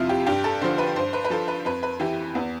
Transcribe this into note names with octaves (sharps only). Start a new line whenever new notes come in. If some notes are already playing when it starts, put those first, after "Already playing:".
Already playing: F2 C3 F3 E4 F4
G4
G2 G4
A4
D3 F3 C5
B4
G2 C5
B4
B4
F3 A4
B4
F2 B4
B4
E3 G4
E2 B3